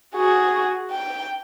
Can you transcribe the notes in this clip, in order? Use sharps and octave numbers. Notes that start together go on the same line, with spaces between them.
F#4 G#4
G5